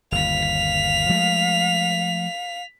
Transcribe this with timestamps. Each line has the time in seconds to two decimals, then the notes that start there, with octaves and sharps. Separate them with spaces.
0.12 G1 D#2 F5 B6 F7
1.09 F3 G#3 A3